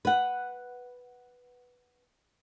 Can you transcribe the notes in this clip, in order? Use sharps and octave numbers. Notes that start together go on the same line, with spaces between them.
B4 F#5